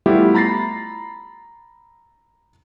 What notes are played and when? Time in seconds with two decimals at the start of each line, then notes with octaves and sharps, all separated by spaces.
0.06 G3 A3 B3 E4 F4 G4
0.34 A#5 B5 A6 A#6 C7